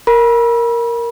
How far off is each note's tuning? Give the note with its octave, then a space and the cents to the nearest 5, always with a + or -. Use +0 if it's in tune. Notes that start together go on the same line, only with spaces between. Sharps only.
A#4 +0 B5 -35